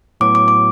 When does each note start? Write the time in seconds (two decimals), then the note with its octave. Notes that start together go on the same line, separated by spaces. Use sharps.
0.21 A2 F#3 B3 F#4 D6
0.35 D6
0.48 D6